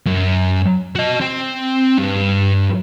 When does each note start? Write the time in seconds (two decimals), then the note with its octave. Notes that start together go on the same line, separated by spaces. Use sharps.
0.06 F#2
0.95 F#4 D#5
1.21 C4
1.98 G2